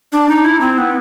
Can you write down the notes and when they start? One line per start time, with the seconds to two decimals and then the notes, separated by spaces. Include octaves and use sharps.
0.12 D4
0.29 D#4
0.44 E4
0.61 C4
0.78 B3